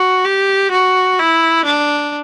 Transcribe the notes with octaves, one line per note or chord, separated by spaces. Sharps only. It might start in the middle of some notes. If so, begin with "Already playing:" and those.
Already playing: F#4
G4
F#4
E4
D4